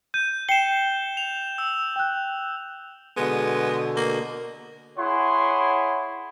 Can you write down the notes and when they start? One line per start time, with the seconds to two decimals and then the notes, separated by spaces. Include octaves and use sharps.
0.14 G6 D#7
0.49 G5 C7 C#7 E7 G7
1.17 F7
1.58 E6
1.96 G5 F#6
3.17 B2 D3 G#3 B3
3.97 A#3
4.98 E4 G#4 C#5 F#5 C6